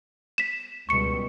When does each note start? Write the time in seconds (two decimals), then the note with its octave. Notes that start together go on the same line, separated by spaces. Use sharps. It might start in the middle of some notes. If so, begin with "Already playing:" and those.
0.38 B6 E7
0.89 C#2 B2 G3 C#6 C#7